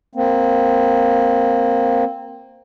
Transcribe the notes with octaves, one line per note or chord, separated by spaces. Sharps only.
A#3 C4